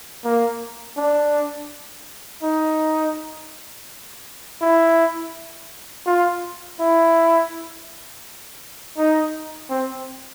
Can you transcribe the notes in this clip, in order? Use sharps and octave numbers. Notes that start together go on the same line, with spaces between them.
A#3
D4
D#4
E4
F4
E4
D#4
C4